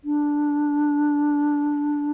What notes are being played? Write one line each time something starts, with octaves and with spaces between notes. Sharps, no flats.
D4